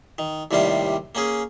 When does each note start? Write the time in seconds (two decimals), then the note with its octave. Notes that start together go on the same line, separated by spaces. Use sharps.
0.18 D#3
0.51 D#2 A2 C3 G3 D4 F5
1.15 A#3 C#4 G#4